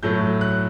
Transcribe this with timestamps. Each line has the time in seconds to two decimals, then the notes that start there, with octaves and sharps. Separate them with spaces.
0.03 A2 F#3 A3 G6
0.41 F#6